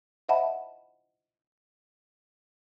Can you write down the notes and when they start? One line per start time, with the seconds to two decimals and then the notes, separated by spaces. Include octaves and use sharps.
0.29 C5 D#5 E5 F#5 A5 B5